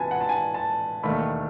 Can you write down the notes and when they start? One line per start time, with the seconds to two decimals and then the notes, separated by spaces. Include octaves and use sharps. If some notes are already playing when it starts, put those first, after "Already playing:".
Already playing: C#2 C#3 E3 B3 F#4 B4 G#5 A5
0.11 F#5
0.21 A5
0.29 G#5
0.54 A5
1.03 E1 D#2 D#3 A3 B5